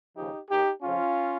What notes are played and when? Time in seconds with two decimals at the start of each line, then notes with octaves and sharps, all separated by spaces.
0.17 D#2 C#3 F3 D#4 G4
0.49 D#2 D#3 D#4 G4
0.82 F2 C#3 F3 C#4 F4